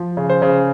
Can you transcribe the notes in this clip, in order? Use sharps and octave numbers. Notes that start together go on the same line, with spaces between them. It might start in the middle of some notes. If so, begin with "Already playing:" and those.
Already playing: F3
C#3
C5
C#3